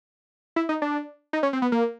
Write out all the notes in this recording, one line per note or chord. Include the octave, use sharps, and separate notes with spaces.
E4
D#4
D4
D#4
C#4
C4
B3
A#3